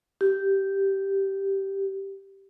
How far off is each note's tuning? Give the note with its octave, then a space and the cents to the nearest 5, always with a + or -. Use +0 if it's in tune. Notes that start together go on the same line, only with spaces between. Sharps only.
G4 -10